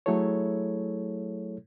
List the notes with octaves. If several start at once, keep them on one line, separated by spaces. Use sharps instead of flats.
F#3 A3 E4 G#4 A4 C#5